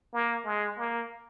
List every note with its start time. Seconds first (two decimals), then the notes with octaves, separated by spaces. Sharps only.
0.13 A#3
0.45 G#3
0.78 A#3